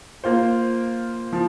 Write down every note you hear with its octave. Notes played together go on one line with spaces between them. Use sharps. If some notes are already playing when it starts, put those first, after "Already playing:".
A#3 F4 C5
F3